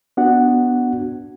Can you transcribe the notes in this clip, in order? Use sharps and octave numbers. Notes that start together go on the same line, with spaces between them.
B3 D4 F#4 F#5